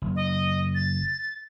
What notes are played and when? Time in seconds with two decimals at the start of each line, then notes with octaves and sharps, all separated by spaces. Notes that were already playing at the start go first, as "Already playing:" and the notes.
0.02 F#1
0.16 D#5
0.75 A6